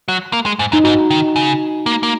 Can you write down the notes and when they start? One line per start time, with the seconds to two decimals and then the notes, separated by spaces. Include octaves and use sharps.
0.08 F#3
0.33 A#3
0.46 G#3
0.59 G#2
0.72 F#2 D#4
0.84 G#2 F#4
1.10 D#3
1.36 C#3
1.86 A#3
2.03 A#3